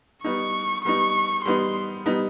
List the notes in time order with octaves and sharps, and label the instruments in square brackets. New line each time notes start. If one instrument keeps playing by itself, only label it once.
[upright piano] G3 B3 D#4 [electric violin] C#6
[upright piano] G3 B3 D#4 [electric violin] C#6
[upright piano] G3 B3 D#4 [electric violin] C6
[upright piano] G3 B3 D#4